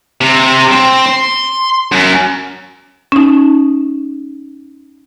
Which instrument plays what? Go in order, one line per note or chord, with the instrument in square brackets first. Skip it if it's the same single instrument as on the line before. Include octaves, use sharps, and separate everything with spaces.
[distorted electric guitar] C3
C4
C6
F#2
[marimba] C#4 D#4